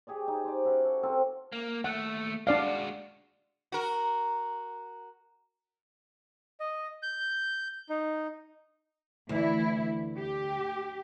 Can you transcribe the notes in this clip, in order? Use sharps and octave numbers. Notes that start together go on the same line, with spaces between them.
G4 G#4 C#5 D5
D#4
C5 D5
C#4 E4 F#4
A4
C4 F4 A4
A#3
D#2 A3 F#5
G#3 D4 F#4 D5 F5
F#4 A#4
D#5
G6
D#4
D2 E3 E4
G4